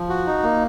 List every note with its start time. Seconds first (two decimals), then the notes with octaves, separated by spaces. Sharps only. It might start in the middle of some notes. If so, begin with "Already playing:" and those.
Already playing: F3
0.09 F#4
0.27 D#4
0.43 A#3